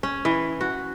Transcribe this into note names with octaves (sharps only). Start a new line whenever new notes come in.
C#4
E3
F#4